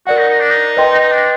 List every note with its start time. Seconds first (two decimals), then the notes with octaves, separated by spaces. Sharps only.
0.06 F#4 A#4 D5 F#5
0.18 D#4
0.30 D#4
0.40 D4
0.50 D#4
0.77 B4 D#5 G5 C6
1.01 D#4
1.12 D4